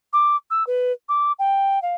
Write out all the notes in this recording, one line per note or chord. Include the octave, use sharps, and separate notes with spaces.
D6
E6
B4
D6
G5
F5